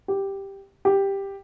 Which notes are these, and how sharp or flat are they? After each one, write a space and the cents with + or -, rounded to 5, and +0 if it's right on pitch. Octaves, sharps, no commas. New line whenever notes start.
G4 +0
G4 +5